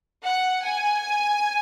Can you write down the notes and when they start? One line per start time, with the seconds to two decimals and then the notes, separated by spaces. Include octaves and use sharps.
0.25 F#5
0.65 G#5